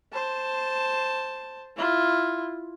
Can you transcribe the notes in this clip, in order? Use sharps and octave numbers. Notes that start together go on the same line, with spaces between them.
C5 A5
E4 F4